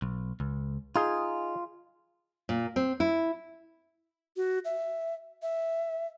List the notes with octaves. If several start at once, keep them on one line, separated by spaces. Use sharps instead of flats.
B1
C#2
D#4 F4 G#4
A#2
C4
E4
F#4
E5
E5